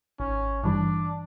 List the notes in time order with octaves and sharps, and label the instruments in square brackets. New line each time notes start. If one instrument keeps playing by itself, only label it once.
[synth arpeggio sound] G#1 [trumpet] C#4
[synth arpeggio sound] G2 E3 G3 [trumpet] D4